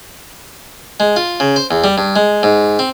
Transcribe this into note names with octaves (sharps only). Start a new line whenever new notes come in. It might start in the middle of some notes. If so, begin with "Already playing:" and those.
G#3
F4
C#3
C5
E2
G3
G2
G#3
G#2
C4